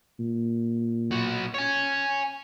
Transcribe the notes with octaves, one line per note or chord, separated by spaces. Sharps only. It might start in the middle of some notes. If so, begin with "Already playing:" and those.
A#2
B1 F#4
C#5 G#5